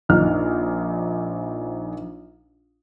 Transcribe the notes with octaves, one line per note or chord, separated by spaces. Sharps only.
A#1 D#4 F6